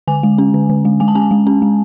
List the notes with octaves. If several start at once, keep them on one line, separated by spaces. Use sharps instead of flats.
D3 G#5
G#3
C#4
D3
D3
G#3
G#3 G#5
A5
C#4 G#5
G#3
C#4
G#3